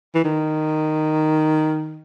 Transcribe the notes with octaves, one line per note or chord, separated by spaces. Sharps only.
E3
D#3